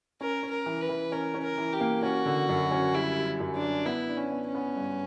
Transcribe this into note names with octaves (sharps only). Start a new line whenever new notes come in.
C#4 A#4
C#4
A#4
E3
B4
E3
C#4 A#4
C#4
A#4
E3
G4
A#3
C#4 F#4
D3
F#2
C#4
G3 E4
G3
F#2
D4
G3
B3 E4
D4
C#4
B3
C#4
B3
G2